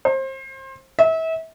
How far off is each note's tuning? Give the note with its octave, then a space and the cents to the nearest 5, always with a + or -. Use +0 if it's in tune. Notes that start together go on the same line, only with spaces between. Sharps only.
C5 +30
E5 -30